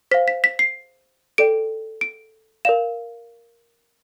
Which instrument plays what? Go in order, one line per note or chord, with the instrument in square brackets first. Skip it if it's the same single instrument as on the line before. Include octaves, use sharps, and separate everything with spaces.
[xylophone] C5 F5 B6
B6
B6
C7
A4 D5 G5 D7
D7
A#4 D5 F5 E7